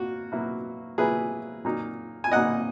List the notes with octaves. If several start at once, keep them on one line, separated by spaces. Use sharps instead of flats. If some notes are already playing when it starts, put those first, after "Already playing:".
Already playing: A#3 F#4
B2 F#3 A#3 E4
B2 F#3 A#3 E4 G#4 B4
A#2 F#3 A#3 D#4
G#5
A#2 F#3 A#3 D#4 D#5 F#5